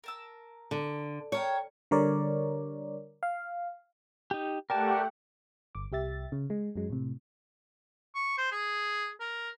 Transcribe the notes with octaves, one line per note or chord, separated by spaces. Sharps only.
A#4 A5 E6
D3
A4 A#4 C#5 G5
D3 G3 A#4 C#5 D5
F5
D#4 G4
A3 G4 A#4 D5 F#5 G5 A5
G1 D6
C2 G4 E5 A6
C#3
G#3
F#2 F#3 G#3
A2 C3
C#6
C5
G#4
A#4